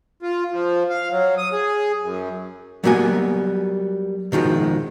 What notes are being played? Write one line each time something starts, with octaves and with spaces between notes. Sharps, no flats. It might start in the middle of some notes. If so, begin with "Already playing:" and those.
F4
F3
F5
F#3
D#6
G#4
F#2
F#3 G3 A#3 B3 G#5
B2 D#3 F3 G#3